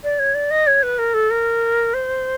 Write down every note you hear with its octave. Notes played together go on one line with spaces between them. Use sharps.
D5
C#5
D5
D#5
C#5
B4
A#4
A4
A#4
C5